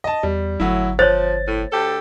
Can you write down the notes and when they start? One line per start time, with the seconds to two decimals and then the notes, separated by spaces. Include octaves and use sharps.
0.04 D#5 A5
0.23 E2 G3
0.60 G1 A2 F#3 E4
0.99 F3 C5 C#5 A6
1.47 A2
1.71 D2 G4 A4